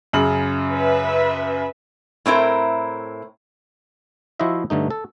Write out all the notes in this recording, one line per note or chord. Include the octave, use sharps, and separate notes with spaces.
F#2 C#3 F#7
B4 E5
A2 C4 E4 A#4
F3 E4 F#4 C5 D#5 E5
G2 D3 A3 D#4
A4